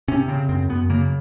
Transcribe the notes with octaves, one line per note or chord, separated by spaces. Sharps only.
C3 C#4
C#3 C4
F#2 C4
F#2 B3
C#3 A#3